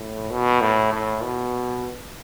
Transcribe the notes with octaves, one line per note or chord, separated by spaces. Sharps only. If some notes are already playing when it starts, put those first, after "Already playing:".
Already playing: A2
B2
A2
A2
B2